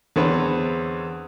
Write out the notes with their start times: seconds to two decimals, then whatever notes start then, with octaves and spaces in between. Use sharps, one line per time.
0.16 E2 D3 C4 B4 C#5